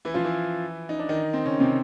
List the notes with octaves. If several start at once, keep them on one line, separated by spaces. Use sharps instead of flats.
E3 E4
F3 F4
E3 E4
D#4
D4
D#3 D#4
C4
C#3 C#4
C3 C4